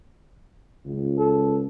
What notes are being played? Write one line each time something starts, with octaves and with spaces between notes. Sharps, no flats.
C#2
A4